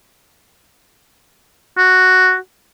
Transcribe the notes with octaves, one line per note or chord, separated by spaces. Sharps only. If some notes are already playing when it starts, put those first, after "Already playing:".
F#4